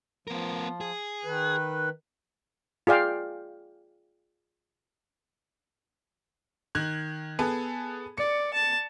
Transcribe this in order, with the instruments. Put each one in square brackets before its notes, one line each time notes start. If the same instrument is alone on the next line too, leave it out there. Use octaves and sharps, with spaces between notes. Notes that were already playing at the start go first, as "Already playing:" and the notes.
[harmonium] F3 [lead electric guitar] B3 A#4
[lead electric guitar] G#4
[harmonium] D#3 B4
[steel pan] F4 G#4 D5 F5 G5
[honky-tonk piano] D#3 F#6 G#6
B3 G#4 A4
[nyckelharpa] D5 [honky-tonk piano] C#7
[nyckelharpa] A5